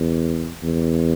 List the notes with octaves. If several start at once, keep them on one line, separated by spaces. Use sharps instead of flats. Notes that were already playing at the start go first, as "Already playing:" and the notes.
Already playing: E2
E2